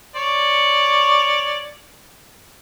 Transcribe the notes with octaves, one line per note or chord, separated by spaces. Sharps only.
C#5 D5